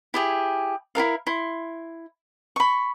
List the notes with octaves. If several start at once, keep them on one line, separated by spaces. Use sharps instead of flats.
E4 G4 G#4
E4 F4 A#4 F5
E4 C6
B5 C#6